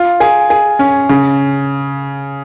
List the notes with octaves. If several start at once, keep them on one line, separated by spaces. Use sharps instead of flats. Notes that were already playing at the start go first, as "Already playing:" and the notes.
Already playing: F4
G#4
G#4
C#4
C#3